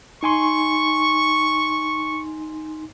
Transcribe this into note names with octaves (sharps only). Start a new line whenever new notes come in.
D#4 G#5 C6 C#6